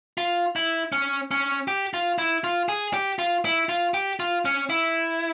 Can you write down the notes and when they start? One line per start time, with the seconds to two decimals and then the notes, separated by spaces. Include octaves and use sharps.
0.18 F4
0.56 E4
0.92 C#4
1.31 C#4
1.68 G4
1.94 F4
2.18 E4
2.44 F4
2.69 G#4
2.94 G4
3.19 F4
3.45 E4
3.69 F4
3.94 G4
4.20 F4
4.45 C#4
4.70 E4